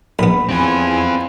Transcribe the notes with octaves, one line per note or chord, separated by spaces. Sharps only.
A#1 B3 B5
E2 C4 F4 G#5